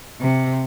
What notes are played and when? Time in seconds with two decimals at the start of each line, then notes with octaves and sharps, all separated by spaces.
0.21 C3